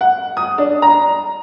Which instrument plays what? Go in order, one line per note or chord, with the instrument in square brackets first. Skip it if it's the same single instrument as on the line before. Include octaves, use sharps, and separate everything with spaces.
[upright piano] F#5
D#6
D4
A#5